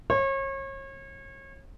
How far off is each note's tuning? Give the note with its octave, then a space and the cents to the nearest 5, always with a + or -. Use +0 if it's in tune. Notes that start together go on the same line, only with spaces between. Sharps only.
C#5 -35